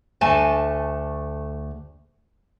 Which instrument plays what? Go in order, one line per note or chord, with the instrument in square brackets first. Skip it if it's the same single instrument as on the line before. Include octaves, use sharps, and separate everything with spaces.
[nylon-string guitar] D2 A3 G#5 A5